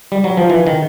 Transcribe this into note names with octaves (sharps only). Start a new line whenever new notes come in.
G3
F#3
F3
E3
D#3